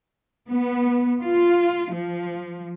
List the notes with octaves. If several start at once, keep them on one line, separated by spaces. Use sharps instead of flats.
B3
F4
F3